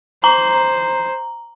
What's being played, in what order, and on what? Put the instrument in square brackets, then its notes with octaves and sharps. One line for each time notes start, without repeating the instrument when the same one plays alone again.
[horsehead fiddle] C5 [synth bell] A#5